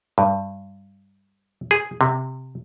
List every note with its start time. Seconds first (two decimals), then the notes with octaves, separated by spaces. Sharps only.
0.18 G2
1.71 G#4
2.01 C3